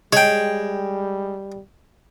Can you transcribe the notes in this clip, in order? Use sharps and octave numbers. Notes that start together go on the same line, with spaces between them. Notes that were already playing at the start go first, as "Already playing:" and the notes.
G3 G#3 C#5 G5